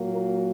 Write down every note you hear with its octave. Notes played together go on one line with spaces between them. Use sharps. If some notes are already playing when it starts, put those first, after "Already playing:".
Already playing: A#2 F#3 A#3
A#4